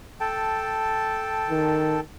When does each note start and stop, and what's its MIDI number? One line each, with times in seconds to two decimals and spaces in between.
0.20 2.00 69
0.20 2.00 79
0.20 2.00 81
1.50 1.99 51